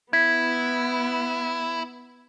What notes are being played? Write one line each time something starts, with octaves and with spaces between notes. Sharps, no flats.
B3 E4 G#6 B6